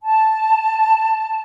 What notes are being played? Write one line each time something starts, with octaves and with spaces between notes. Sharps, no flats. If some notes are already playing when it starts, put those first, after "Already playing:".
A5